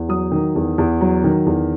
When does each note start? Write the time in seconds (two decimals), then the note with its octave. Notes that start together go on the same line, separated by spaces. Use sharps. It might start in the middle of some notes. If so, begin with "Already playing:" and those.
Already playing: E2
0.09 F#3 D#6
0.32 D#3
0.55 E2
0.78 E2
1.01 F#3
1.24 D#3
1.46 E2